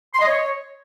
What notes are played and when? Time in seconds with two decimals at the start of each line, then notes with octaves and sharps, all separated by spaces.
0.15 C6
0.21 D#5
0.28 C#5